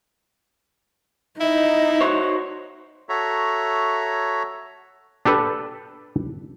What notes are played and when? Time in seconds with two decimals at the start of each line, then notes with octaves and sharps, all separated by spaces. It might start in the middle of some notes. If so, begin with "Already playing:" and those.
1.40 D#4 E4 D#5
2.01 F#4 C5 C#5
3.09 F#4 A4 C#5 E5 A#5
5.25 D4 G4 A4 B4